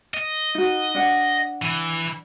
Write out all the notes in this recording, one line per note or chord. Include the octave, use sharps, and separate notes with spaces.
D#5
D#4 F#4
D4 F#5
E3